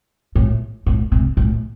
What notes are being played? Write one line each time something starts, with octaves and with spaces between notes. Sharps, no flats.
A2
A2
C3
A2